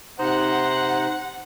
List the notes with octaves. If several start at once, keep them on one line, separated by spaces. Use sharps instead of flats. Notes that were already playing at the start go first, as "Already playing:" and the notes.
C3 D#4 C5 F#5 A#5